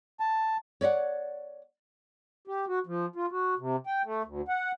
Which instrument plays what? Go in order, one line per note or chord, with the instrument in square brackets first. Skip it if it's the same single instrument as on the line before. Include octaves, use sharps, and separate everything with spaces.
[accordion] A5
[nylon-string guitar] C#5 D5 E5 F#5
[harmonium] G4
F#4
F3
F4
F#4
C3
G5
A3
D2
F#5